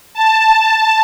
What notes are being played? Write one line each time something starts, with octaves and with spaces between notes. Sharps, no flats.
A5